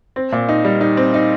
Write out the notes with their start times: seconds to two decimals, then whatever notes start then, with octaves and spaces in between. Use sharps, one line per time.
0.16 C4
0.32 A#2
0.49 D#4
0.65 G3
0.81 D#4
0.97 C4
1.14 D#4